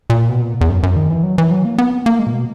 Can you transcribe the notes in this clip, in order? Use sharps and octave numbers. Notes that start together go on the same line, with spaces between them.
A#2
B2
A#2
E2
F#2
F#2
D#3
E3
F#3
E3
F#3
A#3
B3
A#3
G#3
A#2
B2